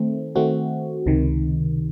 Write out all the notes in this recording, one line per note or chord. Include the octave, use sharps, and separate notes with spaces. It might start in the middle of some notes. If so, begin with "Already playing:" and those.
Already playing: D#3 A3 C4
D#3 A3 C4 F#4
C#2 C3 D#3